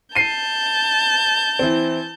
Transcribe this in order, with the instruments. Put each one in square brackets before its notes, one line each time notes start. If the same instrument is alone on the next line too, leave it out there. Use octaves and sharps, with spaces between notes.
[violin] A5 G6 [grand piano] C7 D#7
[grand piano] E3 C4